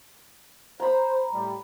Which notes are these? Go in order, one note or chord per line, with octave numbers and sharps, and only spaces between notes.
C5 A#5 B5
A2 G3